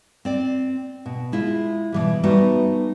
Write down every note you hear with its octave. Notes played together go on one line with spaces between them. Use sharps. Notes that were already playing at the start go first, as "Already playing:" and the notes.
C4 D5
B2
G#3 E4 F4
B2 E3 G3
G3 A3 B3 D#4 F#4